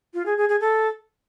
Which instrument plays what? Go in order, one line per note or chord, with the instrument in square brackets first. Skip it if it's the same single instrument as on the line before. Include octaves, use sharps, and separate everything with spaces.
[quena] F4
G#4
G#4
G#4
A4